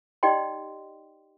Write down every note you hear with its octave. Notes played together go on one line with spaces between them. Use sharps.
D#4 G4 D5 D#5 G5 C6